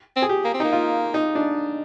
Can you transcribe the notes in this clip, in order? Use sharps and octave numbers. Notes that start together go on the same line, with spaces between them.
C4
G#4
G4
A#3
C4
A#3 D#4
F4
D#4
D4